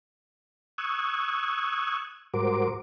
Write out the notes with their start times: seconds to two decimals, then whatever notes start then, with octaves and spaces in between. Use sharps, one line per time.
0.78 C#6 D#6 E6 F#6 G#6
2.34 G#2 G3 F#4 A#4 C5 D6